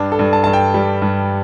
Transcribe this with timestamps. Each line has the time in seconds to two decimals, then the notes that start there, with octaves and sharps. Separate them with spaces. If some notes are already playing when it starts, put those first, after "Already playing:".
Already playing: G2 D4
0.12 A4
0.19 G2
0.33 A5
0.44 G2 A5
0.53 G5
0.74 G3
1.02 G2